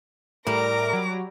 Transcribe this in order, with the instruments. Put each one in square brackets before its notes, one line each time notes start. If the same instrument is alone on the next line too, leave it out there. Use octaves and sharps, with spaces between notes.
[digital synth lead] A2 [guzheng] G3 [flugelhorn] A#4 [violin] A#5 D6
[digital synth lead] F#3